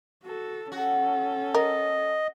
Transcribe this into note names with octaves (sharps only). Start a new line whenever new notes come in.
F#4 A4
C#4 F#4 A4
A#4 D#5